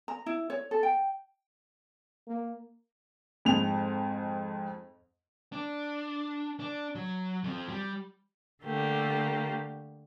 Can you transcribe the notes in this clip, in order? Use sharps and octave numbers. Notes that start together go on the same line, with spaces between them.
A#5
E4
C#5
A4
G5
A#3
F2 G#2 F7
D4
D4
F#3
F2 F3
G3
D3 A3 A#3 G4